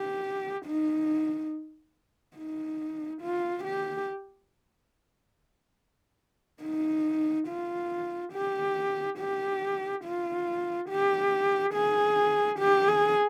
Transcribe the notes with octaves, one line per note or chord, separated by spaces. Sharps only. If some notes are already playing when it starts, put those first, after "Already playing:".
Already playing: G4
D#4
D#4
F4
G4
D#4
F4
G4
G4
F4
G4
G#4
G4
G#4